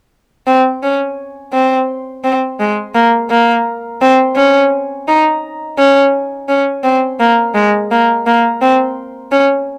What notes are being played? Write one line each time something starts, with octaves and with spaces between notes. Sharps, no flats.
C4
C#4
C4
C4
G#3
A#3
A#3
C4
C#4
D#4
C#4
C#4
C4
A#3
G#3
A#3
A#3
C4
C#4